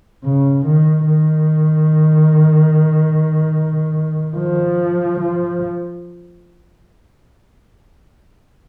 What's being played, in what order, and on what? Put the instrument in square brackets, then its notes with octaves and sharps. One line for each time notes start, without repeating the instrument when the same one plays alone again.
[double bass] C#3
D#3
D#3
F3
F3